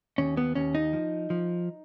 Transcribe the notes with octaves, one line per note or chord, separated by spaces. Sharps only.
D#2 C#4
B3
D#2 C#4
D#4
F3
F3